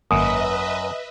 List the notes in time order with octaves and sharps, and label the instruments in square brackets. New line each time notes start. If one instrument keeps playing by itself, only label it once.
[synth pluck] G#1 A#3 [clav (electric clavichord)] F#2 [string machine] B4 D#5 E5 [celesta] D#6